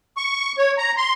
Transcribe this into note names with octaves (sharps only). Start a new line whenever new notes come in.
C#6
C#5
A#5
C6